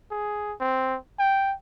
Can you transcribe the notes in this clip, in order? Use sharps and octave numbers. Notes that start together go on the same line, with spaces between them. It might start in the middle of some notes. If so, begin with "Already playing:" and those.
G#4
C4
G5